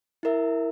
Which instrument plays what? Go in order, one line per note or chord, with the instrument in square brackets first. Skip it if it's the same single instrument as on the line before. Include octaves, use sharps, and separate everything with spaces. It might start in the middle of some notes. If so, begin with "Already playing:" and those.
[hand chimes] E4 A#4 E5